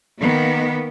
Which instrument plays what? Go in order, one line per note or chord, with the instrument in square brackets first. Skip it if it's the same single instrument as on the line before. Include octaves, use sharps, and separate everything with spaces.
[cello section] D#3 A#3 B3